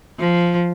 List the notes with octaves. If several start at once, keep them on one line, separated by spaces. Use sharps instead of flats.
F3